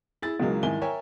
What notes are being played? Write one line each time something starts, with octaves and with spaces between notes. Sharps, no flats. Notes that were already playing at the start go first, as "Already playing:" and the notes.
E4 G#4 A6
C#2 C#3 E3 F#3 G#3 A#3
C2 G#2 D#3 E3 G#5 G7
A#4 C#5 E5 G5 G#5